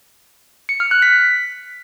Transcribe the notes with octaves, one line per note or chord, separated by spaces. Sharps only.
C#7
F6
F#6
B6